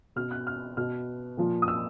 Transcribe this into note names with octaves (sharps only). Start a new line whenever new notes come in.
B2 F6
F#6
F6
B2 F6
A#2 F3
D#6
E6